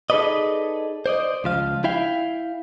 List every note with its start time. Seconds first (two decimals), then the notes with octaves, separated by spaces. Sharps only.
0.10 D#4 G#4 A4 B4 D5 D#5
1.06 C5 D5 D#5
1.44 C#2 F3 F5
1.84 E4 E5 F5 G5